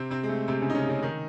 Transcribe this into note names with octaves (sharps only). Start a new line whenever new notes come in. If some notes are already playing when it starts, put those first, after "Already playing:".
Already playing: C3 C4
C3 C4
G#3
A3
C3 C4
C#3 C#4
D#4
C#3 C#4
C#3 C#4
D#3 D#4